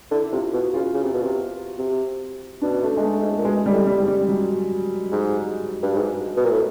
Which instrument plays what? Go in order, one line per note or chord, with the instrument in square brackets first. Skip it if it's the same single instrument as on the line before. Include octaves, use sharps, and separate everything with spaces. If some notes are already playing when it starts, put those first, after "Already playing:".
[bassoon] D3 [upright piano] E4
[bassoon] C3 [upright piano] F4
[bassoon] B2 [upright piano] F#4
[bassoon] C#3 [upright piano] F4
[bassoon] C#3
C3
B2
C3
C3
[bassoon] B2 [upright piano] D4
[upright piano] A3
G#3
A3
[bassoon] G#2
A2
A#2
[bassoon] B2 [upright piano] G#3
[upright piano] G3
[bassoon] A2
[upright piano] G3
[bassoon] G#2
[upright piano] G3
F#3
[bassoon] G#2
G2
G#2
B2
A#2
A2